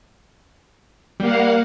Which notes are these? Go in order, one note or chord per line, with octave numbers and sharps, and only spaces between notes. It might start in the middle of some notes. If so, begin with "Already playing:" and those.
G3 A#3 F5 F#5